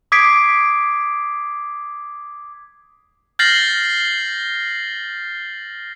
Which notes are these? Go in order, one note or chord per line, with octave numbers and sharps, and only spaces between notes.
D6 D#6 G#6 B6 C7 D7
F6 G6 A6 A#6 C7 F#7